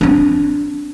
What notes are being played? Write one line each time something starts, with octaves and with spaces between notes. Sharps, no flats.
C4 D4